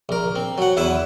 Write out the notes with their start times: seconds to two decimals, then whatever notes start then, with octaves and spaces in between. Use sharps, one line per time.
0.09 A#1 A#4
0.36 C4
0.58 F#3 F#5
0.77 E2 E4 B4 E5